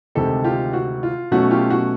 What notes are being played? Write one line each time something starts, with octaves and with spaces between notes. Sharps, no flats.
D2 C3 D#3 G#3 C4 G4 A4
F4 G4
F#4
F4
B2 F#3 A3 C#4 F#4
F4 G4
F#4